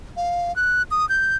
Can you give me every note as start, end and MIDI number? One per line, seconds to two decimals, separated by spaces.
0.17 0.54 77
0.56 0.83 90
0.91 1.08 87
1.09 1.37 91